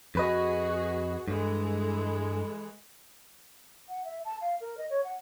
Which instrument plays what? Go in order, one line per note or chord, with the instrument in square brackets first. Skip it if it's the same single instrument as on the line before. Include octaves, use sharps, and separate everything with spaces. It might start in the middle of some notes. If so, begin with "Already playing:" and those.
[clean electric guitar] F2 B4 D#5 [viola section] F#4 G#4
[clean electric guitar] G2 [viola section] E3 G#3 A4
[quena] F#5
E5
A5
F5
A#4
D#5
C#5
F#5